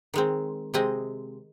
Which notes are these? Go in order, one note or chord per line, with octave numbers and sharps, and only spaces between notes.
D#3 G#3 C4
C3 G#3 C4 D#5